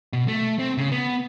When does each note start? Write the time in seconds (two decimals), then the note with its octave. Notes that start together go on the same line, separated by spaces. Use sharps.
0.13 B2
0.28 A3
0.59 C4
0.78 C#3
0.92 B3